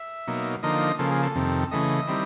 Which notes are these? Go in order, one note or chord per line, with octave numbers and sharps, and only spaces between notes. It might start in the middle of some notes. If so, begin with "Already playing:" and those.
Already playing: E5
B2 F#3 A#3 D#4
D3 F3 A#3 D#4 D#5
C#3 F3 A#3 A4
G#4
A4
F2 C3 D#3
C#3 E3 A3 D#5
D#3 G3 C4 E4